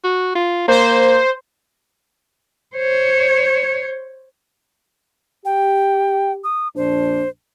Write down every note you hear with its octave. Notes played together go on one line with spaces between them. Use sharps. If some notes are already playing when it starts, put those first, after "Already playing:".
F#4
F4
A#3 C5
C5 C#5
G4 G5
D#6
A#1 F2 D4 C5